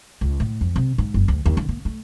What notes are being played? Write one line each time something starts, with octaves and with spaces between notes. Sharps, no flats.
C#2
A2
F2
C3
G#2
F#1
D2
D#2
D3
A#3
A3